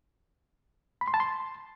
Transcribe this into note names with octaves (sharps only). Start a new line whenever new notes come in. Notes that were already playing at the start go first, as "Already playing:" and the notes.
B5
C6
A5
C6